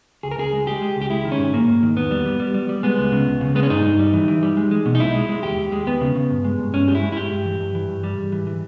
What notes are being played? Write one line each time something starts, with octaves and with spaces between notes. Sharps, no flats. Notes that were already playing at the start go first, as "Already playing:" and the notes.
C#2 G#4
A#4
C#2 G#4
G#3
G#3 G4
G#3
C#2
G4
G#3 E4
D#3
C#4
G#2
G#2 A#3
G#2
D#3
E2 B3
G3
G3
G3
G3
G3
G#3 B3
C#2
C#3
C#2
C#3
G#3 B3
C#4
G2 D#4
G2
G3
E3
E3
G3
G#3
G#3
B2
D#4
B1 E4
G#3
G#3
D#2 G4
D#2
G#3
D#2 B3
C#3
C#3
G2
G#3
G2
G2 C#4
G#3 G4
E4
G#3
E4
G2 G4
G2
E3
G2
E3
G2
G3
G#2
E3
E3